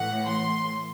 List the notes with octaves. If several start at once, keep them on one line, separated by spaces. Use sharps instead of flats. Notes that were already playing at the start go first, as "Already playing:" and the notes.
Already playing: A2 E3 F#5
C6